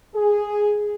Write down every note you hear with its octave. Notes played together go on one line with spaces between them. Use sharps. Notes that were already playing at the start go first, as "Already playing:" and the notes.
G#4